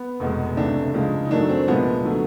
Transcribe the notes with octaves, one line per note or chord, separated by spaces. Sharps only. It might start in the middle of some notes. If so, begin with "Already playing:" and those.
Already playing: B3
F1 E2 B2 G#3
C#2 C3 E3 A3 D4
C#2 C#3 F3 G#3
D#4
F#2 D#3 F#3 A3 D4
C4
C2 A#2 F3 G#3 B3
D3 F#3 A3